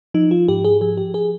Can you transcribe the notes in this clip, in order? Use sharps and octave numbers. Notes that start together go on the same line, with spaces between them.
F3 D#4
F4
G#2 G4
G#4
F3 G#4
G4
G#4